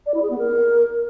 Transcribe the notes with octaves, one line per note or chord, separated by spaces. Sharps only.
D5
E4
G#4
B3
A#4